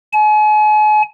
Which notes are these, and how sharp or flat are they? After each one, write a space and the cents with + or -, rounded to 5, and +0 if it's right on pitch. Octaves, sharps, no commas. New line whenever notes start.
G#5 +40